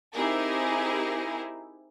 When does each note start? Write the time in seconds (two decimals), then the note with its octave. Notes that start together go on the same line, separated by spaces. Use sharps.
0.13 C4 D#4 E4 G4 G#4 A#4